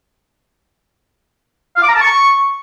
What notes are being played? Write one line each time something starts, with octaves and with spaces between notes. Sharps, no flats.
F5
D6
A#5
A5
C#6